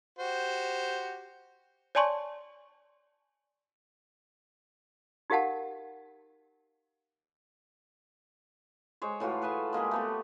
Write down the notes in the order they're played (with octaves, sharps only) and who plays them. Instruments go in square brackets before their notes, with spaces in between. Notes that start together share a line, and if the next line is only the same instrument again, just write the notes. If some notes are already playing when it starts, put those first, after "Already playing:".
[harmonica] F#4 G4 C5
[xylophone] C#5 D5 G#5 A5 C6 C#6
[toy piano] D#4 G4 A#4 F5 F#5 A5
[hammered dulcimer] G#3 C5 C#5
A2 E3 F4 F#4
G#4 B4 G#5 A5
G#3 A#3 G4 G#4
A3 B3 G4